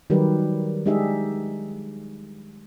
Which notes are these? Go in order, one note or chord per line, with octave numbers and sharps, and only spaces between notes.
D#3 F#3 G3 G4 A#4 B4
G#3 D4 D#4 G4 G#4 E5